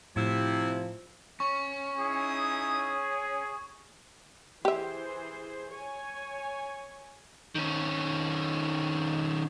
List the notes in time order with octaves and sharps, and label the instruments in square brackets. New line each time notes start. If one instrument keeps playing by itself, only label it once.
[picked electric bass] A2 [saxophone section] C3 E4 [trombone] F3
[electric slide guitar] C#4 [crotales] C#6
[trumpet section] D#4 E4 D#6 [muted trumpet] G#4
[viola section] E3 G#4 C5 [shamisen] G4 E5
[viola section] C#5 G#5
[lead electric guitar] D#3 C#4